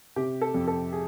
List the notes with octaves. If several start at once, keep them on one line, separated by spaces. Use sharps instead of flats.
C3 G4
A4
F2
A4
G#4